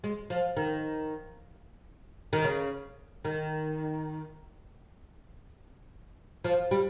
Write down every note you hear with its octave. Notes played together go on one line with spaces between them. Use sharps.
G#3
F3
D#3
D#3
C#3
D#3
F3
G3